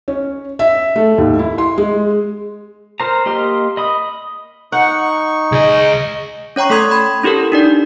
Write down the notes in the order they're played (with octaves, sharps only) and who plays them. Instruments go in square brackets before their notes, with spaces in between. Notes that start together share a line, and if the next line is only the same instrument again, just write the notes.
[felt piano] C#4
E5
A3
D#2
E4
C6
G#3
[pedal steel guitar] A#4 C5 A#5
A#3 G4 D#5 C6 F6
D#5 B5 D#6
[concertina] D#4 C#6 [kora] F#5
[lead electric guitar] C#2 D#5 [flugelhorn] G#4
[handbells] C#4 C#5 G5 A#5 C#6
A3 A4 C6 D#6 G#6
B5 G#6
C#4 E4 G4 A4 A#4
D4 D#4 D5